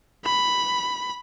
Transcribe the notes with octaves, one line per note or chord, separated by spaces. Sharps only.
B5